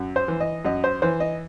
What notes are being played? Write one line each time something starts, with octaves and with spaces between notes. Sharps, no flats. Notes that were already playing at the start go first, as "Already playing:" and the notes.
Already playing: F#2
C5
E3
D#5
F#2 D#5
C5
E3 C5
D#5